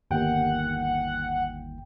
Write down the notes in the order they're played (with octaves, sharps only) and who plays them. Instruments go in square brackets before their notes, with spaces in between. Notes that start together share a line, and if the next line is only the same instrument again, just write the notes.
[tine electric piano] G1 D#2 G5 [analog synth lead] F#5